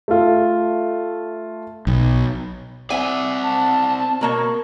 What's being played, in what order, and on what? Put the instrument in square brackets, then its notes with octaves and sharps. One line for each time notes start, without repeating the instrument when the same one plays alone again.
[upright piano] A3 F4
[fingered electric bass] B1
[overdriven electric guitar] C4 D5 [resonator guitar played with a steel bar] E5 G#5 [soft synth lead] F#5
[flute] A5
[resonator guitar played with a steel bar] B2 A#3 C#5 [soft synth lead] A#4